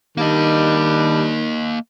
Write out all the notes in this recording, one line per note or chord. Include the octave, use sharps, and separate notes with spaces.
D#3 G3 A#3 D4 D#5